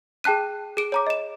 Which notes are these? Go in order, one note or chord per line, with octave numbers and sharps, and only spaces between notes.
G#4 G5 A5 F#6 D#7
G#4 D7
C#5 A#5 D6
D#5 E7